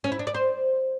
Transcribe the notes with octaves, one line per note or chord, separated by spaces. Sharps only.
C#4
E4
D4
D5
C5